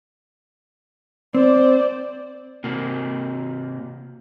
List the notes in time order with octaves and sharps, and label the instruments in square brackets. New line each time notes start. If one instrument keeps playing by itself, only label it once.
[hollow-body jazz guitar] C4 [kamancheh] C5 D5
[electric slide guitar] C3 A#3